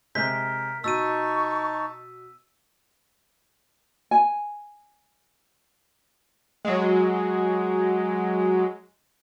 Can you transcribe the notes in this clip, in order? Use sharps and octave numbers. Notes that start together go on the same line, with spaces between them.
C3 G#3 A#4 G6 B6
B2 D#4 A5 C#6 E6 D#7
G#5
F#3 G#3